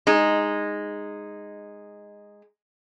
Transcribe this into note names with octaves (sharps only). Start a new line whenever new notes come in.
G#3 D#4